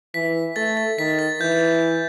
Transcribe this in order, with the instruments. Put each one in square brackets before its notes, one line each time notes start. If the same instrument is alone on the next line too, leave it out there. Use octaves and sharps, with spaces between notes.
[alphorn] E3 [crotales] B6
[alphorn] A3 [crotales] A6
[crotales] A6
[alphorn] D#3 [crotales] B6
[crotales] A6
[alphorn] E3 [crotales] G6